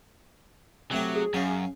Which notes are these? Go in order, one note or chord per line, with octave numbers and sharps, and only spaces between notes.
C3 F#3 A3 G4
G#4
F#2 C#4 F5